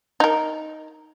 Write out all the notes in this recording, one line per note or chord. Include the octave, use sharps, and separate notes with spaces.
D#4 A#4